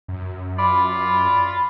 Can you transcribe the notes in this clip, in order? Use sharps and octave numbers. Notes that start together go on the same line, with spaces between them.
F#2
F4 D5 B5